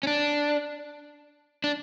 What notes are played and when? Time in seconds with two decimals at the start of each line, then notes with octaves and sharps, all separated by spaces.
0.03 C#4
0.07 D4
1.64 D4